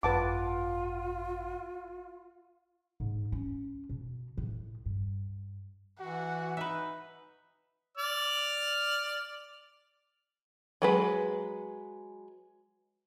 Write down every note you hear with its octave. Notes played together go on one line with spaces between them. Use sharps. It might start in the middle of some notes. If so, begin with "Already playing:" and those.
G#1 F#2 F4 B4 F#5 A5 D6
G#2
C#4
B2
A2
G2
E3 F#4 F#5
D#4 B4 E5
D5 F6
F#3 G#3 B4